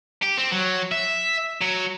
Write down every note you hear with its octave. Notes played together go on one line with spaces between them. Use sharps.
G4
C4
F#3
E5
F#3